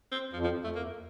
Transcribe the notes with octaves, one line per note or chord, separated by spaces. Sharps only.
C4
F2 F3
F3
A3
F2 A#3